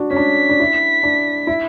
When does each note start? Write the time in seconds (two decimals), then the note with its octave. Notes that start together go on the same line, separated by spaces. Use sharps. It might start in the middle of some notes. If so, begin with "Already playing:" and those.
Already playing: D4 F#4
0.11 C#4
0.16 D4 B6
0.49 D4
0.60 E4
1.03 D4
1.47 E4